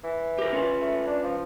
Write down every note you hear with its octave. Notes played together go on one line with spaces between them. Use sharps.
E3
G4 A#4
C#4 F4 B4
A3
D4
F3